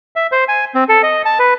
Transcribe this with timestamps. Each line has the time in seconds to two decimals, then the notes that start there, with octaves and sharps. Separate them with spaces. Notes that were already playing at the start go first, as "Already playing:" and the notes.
0.16 E5
0.32 C5
0.48 G#5
0.75 C4
0.89 A4
1.03 D#5
1.25 A5
1.39 B4